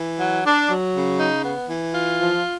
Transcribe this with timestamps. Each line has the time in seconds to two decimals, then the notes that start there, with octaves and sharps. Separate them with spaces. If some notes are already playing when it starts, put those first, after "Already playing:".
Already playing: E3
0.19 F#3
0.44 D4
0.69 F#3
0.94 C#3
1.19 D#4
1.44 B3
1.69 E3
1.94 F4
2.20 F3